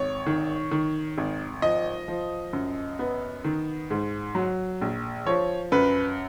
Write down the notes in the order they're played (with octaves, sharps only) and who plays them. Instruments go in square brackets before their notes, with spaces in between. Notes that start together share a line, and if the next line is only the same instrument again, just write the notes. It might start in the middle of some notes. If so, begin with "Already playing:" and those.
Already playing: [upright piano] G#1 C#5
D#3
D#3
G#1
F3 D#5
F3
F#2
B3
D#3
G#2
F#3
A#1
F3 C#5
F#2 B4